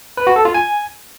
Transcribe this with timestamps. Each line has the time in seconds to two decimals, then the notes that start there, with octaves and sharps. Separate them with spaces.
0.17 B4
0.27 F#4
0.36 A4
0.45 F4
0.54 G#5